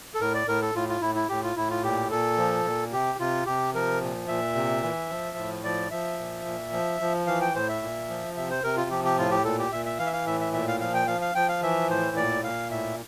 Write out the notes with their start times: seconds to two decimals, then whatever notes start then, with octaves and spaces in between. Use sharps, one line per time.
0.14 A4
0.20 A2 A#4
0.34 D5
0.47 A2 A#4
0.62 A4
0.74 A2 F4
0.89 F4
1.01 A2 E4
1.15 E4
1.29 A2 G4
1.43 F4
1.56 A2 E4
1.70 F4
1.83 A#2 G4
2.11 A#2 A4
2.38 F3
2.65 A#2
2.92 C3 G4
3.19 C3 F4
3.46 C3 G4
3.74 F3 A#4
4.01 A#2
4.28 A#2 E5
4.55 C3
4.83 E3
5.09 F3
5.37 A2
5.64 F3 D5
5.91 F3 E5
6.19 A#2
6.45 A#2
6.73 F3
7.01 F3
7.27 E3 F5
7.41 G5
7.55 A2 C5
7.69 E5
7.82 A#2
8.09 F3
8.36 C3 E5
8.50 C5
8.64 C3 A#4
8.76 F4
8.90 F3 G4
9.05 G4
9.17 A2 F4
9.31 G4
9.44 A#2 A4
9.59 G4
9.72 A#2 E5
9.86 E5
9.99 E3 F5
10.06 E5
10.13 F5
10.26 A2 E5
10.40 E5
10.53 A#2 E5
10.68 F5
10.80 F3 F5
10.94 G5
11.07 F3 F5
11.21 F5
11.35 F3 G5
11.49 F5
11.62 E3 E5
11.89 A2 C5
12.17 A#2 D5
12.44 A#2 F5
12.71 A2 E5